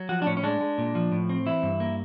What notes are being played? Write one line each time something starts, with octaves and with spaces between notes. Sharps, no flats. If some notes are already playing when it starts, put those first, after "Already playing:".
Already playing: F#3
F3 F#4
D4
A2 C#4
C#4
G#3 D4
G#3
A#2
F3
A2
C4
E3 E4
G2
A#3